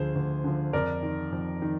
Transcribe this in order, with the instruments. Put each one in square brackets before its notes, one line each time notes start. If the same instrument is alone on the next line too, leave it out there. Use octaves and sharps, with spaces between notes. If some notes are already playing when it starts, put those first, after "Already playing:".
Already playing: [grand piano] D2 D3 F3 G#4 C5
D2
D3 F3
F2 A#4 D5
D#3
F2
D#3